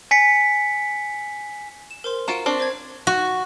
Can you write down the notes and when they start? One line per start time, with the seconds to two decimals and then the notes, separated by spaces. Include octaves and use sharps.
0.11 G#5 B6 C#7
1.91 E7
2.04 A#4 C5 C6
2.28 F4 F#4 A#5 D7 E7
2.46 C4 D4 C6 C#6
2.60 C5 G#6
3.07 F#4